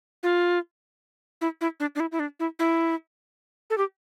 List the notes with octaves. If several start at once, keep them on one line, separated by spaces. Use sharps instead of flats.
F4
E4
E4
D4
D4
E4
E4
D4
E4
E4
A4
G4